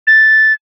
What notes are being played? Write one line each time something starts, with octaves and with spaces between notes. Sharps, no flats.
A6